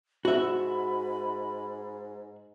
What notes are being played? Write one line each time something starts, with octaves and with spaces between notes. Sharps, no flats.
G#2 F#4 E5 B5